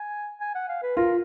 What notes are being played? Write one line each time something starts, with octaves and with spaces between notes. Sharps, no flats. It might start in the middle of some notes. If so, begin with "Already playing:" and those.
Already playing: G#5
G#5
F#5
F5
B4
F4 A#4